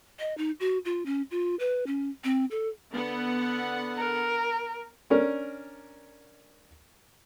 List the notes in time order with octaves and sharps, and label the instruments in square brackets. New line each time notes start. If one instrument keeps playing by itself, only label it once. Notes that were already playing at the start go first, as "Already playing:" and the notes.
[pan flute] D#5
D#4
F#4
F4
C#4
F4
B4
C#4
C4
A4
[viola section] D3 B3 F#5
[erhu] A#4
[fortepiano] C#4 D4 A#4